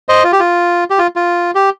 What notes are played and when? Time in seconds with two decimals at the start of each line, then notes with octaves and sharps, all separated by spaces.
0.09 C5 D#5
0.24 F4
0.32 G4
0.39 F4
0.90 G4
0.99 F4
1.16 F4
1.55 G4